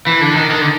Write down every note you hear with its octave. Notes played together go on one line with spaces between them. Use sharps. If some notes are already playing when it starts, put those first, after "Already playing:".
E3
D3
D#3
D#3
D3